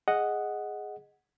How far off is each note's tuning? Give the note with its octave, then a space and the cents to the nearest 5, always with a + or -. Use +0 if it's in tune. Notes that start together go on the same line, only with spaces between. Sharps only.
G#4 +0 D#5 +0 F#5 +0